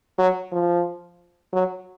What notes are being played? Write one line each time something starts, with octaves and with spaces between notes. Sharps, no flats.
F#3
F3
F#3